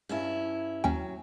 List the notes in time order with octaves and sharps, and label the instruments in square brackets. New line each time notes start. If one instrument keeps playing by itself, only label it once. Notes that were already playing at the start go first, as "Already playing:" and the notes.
[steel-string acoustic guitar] G2 C#4 E4
[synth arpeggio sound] D#2 C#4 G5 [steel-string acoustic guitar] F#3